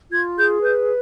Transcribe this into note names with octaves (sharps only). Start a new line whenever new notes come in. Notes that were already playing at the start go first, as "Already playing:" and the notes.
F4 G#6
G#4 G6
B4 G6